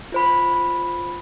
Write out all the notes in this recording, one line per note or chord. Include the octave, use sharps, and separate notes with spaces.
F4 C5 B5